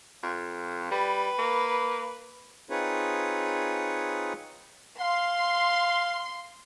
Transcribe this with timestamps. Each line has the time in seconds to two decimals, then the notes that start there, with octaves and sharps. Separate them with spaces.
0.23 F2
0.91 G3 B4
1.38 A#3
2.70 C4 D#4 F4 G#4 B4 C#5
5.00 F5 C6